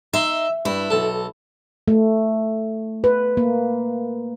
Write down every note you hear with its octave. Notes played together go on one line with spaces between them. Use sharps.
D#4 E5 C6
G2 E4
B1 A4
A3
B4
A#3